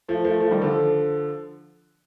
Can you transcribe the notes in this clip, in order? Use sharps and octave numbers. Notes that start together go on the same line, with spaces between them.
F3 A3
F3 A3
F3 A3
D#3 G3
D3 F3